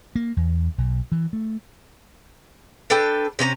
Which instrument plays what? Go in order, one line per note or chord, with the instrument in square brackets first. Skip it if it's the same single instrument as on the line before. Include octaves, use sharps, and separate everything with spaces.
[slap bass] A#3
E2
B1
E3
A3
[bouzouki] D4 A4 B4 G5
C3 C#4 A#4 A#5